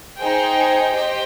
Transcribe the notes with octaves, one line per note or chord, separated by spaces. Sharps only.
D#4 G#4 C5 G5
G4 C5 D#5 G5